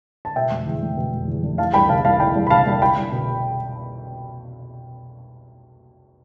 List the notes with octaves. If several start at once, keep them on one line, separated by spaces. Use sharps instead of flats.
A5
B2 E5 G5
F1
E2
F1
B2
F1
E2
F1
E3 F5 A5
C2 G5 B5
C3 F5 A5
C2 F5 A5
E3 G5 B5
C2
B5
C3 F5 A5
C2
C2 G5 B5
C2
B2